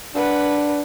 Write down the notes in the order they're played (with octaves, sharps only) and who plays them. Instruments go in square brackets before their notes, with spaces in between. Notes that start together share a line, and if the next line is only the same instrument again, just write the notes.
[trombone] D4 [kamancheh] B4 F#5